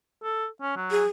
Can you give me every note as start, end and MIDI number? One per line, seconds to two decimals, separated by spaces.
0.23 0.47 69
0.62 0.75 61
0.76 1.02 54
0.91 1.07 68